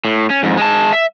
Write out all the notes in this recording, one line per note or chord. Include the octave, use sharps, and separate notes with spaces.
A2
C#4
F2 G#2
G#3 A5
E5